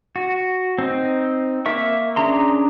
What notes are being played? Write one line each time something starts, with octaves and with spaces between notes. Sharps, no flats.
F#4
C4 D#4
A#3 A#4 E5 C#6
C#4 D4 G#4 A#5 C6